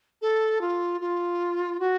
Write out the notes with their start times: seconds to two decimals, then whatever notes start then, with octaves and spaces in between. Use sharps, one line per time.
0.22 A4
0.61 F4
1.01 F4
1.80 F#4